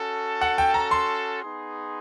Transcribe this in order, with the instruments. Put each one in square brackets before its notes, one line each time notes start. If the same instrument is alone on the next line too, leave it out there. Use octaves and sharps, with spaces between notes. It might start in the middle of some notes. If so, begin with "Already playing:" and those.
Already playing: [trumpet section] C#4 F#4 A4
[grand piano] F#5
G5
A#5
C6
[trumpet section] B3 D#4 G#4